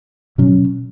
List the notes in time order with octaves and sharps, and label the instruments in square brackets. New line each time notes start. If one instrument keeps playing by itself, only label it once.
[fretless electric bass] B2 F#3 C#4